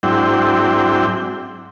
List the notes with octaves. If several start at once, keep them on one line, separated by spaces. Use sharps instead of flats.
G#2 F#3 C4 D4 E4 G5